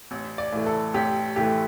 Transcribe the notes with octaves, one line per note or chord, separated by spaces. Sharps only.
A1
D5
A2 E3 A3
A4
A1 G4
A2 E3 A3 G4